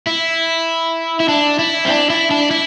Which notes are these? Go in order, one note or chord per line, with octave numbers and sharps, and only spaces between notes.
E4
E4
D4
E4
C4
D4
E4
D4
E4